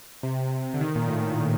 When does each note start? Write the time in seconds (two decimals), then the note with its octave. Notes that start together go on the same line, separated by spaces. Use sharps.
0.23 C3
0.74 D3
0.81 D#3
0.95 A#2
1.08 A2
1.21 A#2